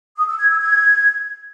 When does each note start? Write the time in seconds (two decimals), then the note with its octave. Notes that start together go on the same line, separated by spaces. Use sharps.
0.17 D#6
0.28 E6
0.39 G#6
0.50 E6
0.60 G#6